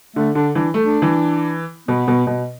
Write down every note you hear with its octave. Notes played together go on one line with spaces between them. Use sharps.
D3 A3
D3 D4
E3 D4
A3
D4
E3
B2 B3
B2
B2